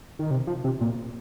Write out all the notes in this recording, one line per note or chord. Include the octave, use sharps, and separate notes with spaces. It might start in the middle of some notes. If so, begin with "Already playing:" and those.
D#3
C3
F3
C3
A#2